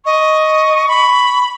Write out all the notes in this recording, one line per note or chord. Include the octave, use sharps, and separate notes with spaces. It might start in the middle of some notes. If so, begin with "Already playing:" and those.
D#5 C#6
B5